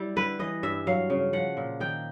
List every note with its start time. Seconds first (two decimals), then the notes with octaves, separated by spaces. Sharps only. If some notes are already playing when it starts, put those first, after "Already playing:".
Already playing: G3 E4
0.16 D3 B4
0.39 E3 D#5
0.63 G2 E5
0.87 F#3 F5
1.10 C#3
1.33 F3 F#5
1.57 A#2
1.80 D#3 G5